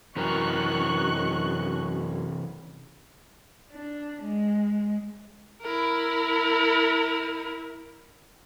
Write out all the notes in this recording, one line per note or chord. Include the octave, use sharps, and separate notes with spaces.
F#2 C3 E3 A#4 D#5 C#6 F#6
D4
G#3
E4 A#4